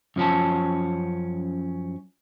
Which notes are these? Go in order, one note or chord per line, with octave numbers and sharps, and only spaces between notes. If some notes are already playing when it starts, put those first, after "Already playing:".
F#2 F3 C#4 A5